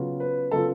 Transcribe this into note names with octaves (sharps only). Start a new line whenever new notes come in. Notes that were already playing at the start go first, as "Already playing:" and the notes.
Already playing: C#3 F#3 B3 F4
B4
C#3 F#3 B3 F4 A4